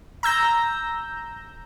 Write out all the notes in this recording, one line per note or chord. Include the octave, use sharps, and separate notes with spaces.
A#5 E6 G6 A#6